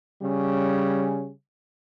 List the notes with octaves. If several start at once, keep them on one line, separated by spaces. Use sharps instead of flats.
C#3 G3 C#4